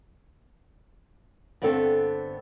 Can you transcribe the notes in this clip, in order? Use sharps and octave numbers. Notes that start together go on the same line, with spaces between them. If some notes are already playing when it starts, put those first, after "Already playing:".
G2 D3 B3 C4 A4